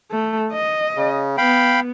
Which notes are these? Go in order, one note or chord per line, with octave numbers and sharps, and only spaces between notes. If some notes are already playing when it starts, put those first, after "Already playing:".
A3
D#5
C#3
B3 F5 G5 B5